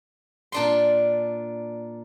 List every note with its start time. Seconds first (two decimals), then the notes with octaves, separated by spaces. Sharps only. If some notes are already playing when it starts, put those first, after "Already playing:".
0.52 A#2 D4 C6